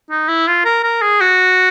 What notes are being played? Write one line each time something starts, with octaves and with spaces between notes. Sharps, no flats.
D#4
E4
F4
A#4
A#4
G#4
F#4